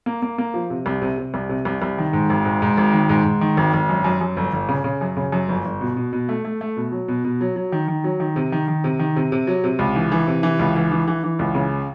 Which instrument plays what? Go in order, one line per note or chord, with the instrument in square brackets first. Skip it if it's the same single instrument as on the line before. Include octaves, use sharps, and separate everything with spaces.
[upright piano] A#3
A#3
A#3
F3
C3
C2
C3
C3
C2
C3
C2
C2
D#3
G#2
G#1
G#2
G#2
G#1
D#3
G#2
G#2
D#3
G#1
G#1
F#2
F#2
F#2
G1
G1
C#3
C#3
F#2
C#3
F#2
G1
G1
B2
B2
B2
A3
A3
A3
B2
F#3
B2
B2
F#3
F#3
D#3
D#3
F#3
D#3
C3
D#3
D#3
C3
D#3
C3
C3
F#3
C3
C#2
E3
E3
C3
E3
C#2
E3
E3
E3
E3
C#2
C#3